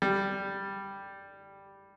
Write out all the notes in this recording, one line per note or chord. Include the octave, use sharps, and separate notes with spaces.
G3